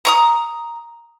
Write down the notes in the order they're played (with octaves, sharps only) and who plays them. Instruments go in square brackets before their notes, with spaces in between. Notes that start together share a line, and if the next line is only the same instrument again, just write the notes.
[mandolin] A#5 C#6 D#6